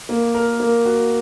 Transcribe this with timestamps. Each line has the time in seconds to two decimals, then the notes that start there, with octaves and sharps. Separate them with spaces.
0.09 A#3
0.34 A#4
0.60 A#3
0.85 F#4